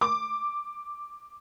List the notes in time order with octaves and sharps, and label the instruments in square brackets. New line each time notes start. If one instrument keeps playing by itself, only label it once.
[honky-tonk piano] D6